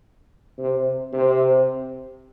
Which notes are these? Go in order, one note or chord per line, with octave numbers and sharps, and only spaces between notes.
C3
C3